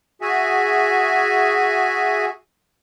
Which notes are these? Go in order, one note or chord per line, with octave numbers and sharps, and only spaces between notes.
F#4 G#4 E5 G#5